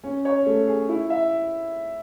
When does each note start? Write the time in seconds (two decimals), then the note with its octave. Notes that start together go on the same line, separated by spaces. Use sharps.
0.04 C#4
0.25 C#5
0.46 A3
0.68 G#4
0.89 E4
1.10 E5